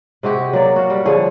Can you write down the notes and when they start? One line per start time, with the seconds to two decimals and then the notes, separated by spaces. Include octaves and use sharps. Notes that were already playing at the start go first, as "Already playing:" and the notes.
0.23 C3 G#3 F#4 G4
0.53 F#3 A#3 D5
0.76 F#4 F5
0.90 G3
1.05 D3 F3 G#4 C#5